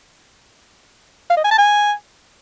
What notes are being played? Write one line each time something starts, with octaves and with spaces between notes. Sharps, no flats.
F5
D#5
G#5
A5
G#5